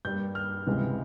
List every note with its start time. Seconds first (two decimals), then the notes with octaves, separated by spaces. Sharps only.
0.05 G2 G3 A#3 G6
0.35 F6
0.67 C#2 C3 E3 G#3